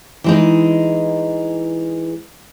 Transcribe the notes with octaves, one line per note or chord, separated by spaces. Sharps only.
E3 G#3 D#4